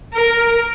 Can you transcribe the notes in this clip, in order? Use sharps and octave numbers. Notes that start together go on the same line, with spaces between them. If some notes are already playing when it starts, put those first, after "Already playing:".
A#4